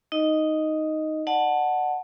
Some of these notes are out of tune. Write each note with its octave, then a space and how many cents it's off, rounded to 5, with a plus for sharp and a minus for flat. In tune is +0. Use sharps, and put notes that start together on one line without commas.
D#4 +0 D#5 +0
D5 +40 F#5 +0 A5 +0